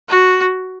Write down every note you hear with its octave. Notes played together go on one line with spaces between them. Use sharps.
F#4